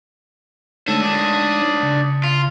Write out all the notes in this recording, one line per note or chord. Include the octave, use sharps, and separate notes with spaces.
D2 G#3 D#4 A4 C#5
D4 G#4
C#3
F4